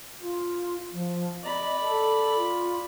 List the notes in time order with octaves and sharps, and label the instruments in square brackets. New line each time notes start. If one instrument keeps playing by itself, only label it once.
[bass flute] F4
F3
[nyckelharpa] D5 B5 [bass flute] D#5
[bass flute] A4
F4